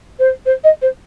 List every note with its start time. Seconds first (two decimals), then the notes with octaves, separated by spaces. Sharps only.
0.19 C5
0.46 C5
0.64 D#5
0.82 C5